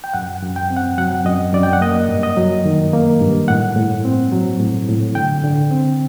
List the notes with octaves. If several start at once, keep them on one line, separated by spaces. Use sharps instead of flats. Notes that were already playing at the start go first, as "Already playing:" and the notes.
G5
F#2 F#5
F#2
G5
C4
F#5
F#3 F#5
F#2 D#5
F#2 D5
G5
F#5
A#3 D#5
G2
D#5
F#3
D#3
A#3
G2
A2 F#5
A2
C4
F#3
A2
A2
D3 G5
D3
C4